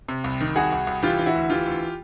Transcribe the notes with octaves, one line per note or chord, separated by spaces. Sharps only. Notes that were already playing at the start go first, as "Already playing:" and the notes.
C3
C2
D#3
C2 F#4 G#4
C2
C2
E3 F4 G4
E3
E4 F#4
D2
E3 F4 G4
D2